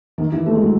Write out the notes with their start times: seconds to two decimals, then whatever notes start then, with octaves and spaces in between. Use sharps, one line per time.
0.18 D#3
0.32 E3
0.46 A3
0.55 G#3
0.62 F#3